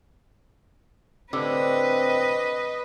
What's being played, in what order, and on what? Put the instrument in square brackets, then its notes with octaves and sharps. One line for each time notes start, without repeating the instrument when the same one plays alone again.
[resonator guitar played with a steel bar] A2 D3 G4 [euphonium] C4 [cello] B4 D#5